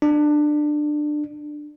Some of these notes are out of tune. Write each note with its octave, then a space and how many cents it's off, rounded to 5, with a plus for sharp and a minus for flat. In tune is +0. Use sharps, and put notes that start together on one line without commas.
D4 +20